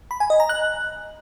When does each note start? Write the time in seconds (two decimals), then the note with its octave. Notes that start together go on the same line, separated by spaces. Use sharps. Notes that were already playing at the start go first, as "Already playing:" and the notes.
0.11 B5
0.20 G#5
0.30 D#5
0.40 A#5
0.49 F#6